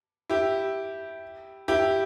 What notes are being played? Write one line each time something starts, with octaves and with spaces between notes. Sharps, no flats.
E4 G4
E4 G4